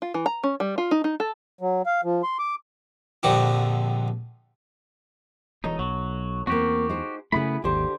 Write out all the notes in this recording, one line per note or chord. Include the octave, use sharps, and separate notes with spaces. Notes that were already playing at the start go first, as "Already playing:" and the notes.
F4
E3
A#5
C#4
G3
F4
D#4
D#4
A4
F#3
F5
F3
C6
D6
A#1 F2 D3 F#4 G4
E1 E2 B2 D#4 A4 C#5
B1 F#3
E2 A#3 C4 F#4 G4
D#4 G#4 C5
F#2 C#3 A3 B3 E4 G#4 B5
G#1 D#2 D3 G4 C5 A5